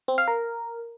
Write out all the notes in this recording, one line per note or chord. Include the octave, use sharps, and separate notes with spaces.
C4
F5
A#4